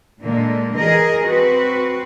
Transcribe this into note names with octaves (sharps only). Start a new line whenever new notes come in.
A#2 D3 G#3 A#3
E3 G#4 A#4 D#5
C4 F#4 B4